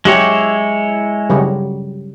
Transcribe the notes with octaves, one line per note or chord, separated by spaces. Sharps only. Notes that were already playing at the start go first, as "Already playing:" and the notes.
F#3 G#3 E4 G4 C#5
C#3 F#3 G3